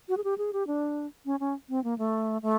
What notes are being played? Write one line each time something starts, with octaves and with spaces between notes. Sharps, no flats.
F#4
G#4
G4
G#4
G4
D4
C#4
C#4
C4
A#3
A3
A3